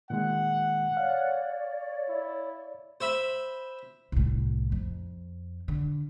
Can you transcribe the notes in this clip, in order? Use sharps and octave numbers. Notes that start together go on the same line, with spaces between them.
A#2 D#3 G#3 F#5
C#5 D5 F5
E4
C5 E5 B5
C2 A2
F2
D3